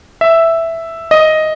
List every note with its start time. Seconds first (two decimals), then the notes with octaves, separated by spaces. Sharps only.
0.21 E5
1.11 D#5